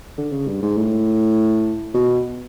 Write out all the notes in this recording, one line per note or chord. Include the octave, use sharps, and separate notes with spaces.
D3
C#3
G2
G#2
A2
B2